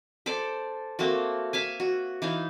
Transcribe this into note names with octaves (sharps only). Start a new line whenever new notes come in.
A4 C5 D5 D6
A3 A#3 C4 F#4
E5 F5 G#5
F#4
E3 D#4 F5